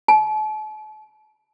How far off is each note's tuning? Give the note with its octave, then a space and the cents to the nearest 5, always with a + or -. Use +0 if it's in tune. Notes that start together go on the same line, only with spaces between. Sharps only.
A5 -40